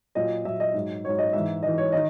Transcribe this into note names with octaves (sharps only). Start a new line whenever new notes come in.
A#2 F#3 D#5
A#2 F#3 E5
D#5
G#2 F#3
G#2 F#3 C#5
D#5
G#2 E3 E5
G#2 E3 D#5
C#5
D#3 D#5